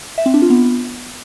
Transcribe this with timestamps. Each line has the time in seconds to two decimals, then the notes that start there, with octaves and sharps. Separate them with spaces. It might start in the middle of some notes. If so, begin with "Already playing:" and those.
0.18 E5
0.26 C4
0.34 D4
0.42 F4
0.50 B3